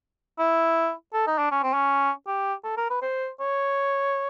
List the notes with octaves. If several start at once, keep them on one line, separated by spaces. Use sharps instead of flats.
E4
A4
D#4
D4
C#4
C4
C#4
G4
A4
A#4
B4
C5
C#5